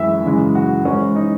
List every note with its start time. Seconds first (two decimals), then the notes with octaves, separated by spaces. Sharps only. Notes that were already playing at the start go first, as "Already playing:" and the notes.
Already playing: F#2 E3 G#3 E5
0.24 F#2 C#3 E3 G#3
0.55 F#4
0.85 G#2 E3 G#3 C#4
1.16 D#4